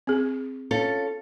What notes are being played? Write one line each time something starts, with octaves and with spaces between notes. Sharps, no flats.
C4 G#4
C#4 F4 A4